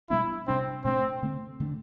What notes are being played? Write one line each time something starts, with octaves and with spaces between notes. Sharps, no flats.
B2 G3 B3 D4 E4
C3 G3 C4 D4
B2 A3 C4 D4
D3 A3 C4
D3 A3 D4